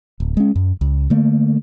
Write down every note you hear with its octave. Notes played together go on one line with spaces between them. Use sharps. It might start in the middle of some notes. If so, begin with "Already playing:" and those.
D1
G#3 C#4
F#2
C#2
D3 A3 A#3